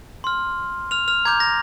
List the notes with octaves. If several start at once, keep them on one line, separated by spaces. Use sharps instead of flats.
C6 F6
F6 F7
F6 F7
A#5 D6 G6 G#6
A#6